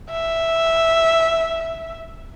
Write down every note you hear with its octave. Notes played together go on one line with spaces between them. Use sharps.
E5